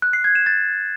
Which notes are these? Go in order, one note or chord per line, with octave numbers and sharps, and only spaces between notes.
F#6
C7
G#6
E7
A6